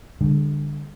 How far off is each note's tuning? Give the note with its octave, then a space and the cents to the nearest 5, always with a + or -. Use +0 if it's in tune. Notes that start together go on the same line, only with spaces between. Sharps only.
D3 +0 G3 +45